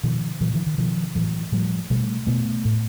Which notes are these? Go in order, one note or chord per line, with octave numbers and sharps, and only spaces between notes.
B2 D#3 F3
A#2 E3 F#3
D#3 F3
D#3
B2 D#3 F3
A2 E3 F#3
A2 F3 G3
B2 G3 A3
B2 A3 B3
A2